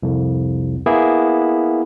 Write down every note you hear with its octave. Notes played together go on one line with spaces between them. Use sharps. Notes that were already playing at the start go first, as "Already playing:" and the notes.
C2 F2
A#3 B3 E4 G#4